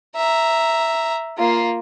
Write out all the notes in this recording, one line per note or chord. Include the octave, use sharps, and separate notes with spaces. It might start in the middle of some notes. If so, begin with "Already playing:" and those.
E5 A#5
A#3 F4